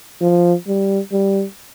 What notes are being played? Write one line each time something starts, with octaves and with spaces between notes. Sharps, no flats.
F3
G3
G3